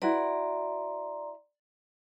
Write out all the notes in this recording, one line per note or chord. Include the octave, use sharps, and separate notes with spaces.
E4 F#4 B4 D5 A#5 C6